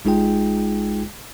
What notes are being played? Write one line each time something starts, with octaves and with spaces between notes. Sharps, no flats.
A1 G#3 D#4 F4 G#4 G5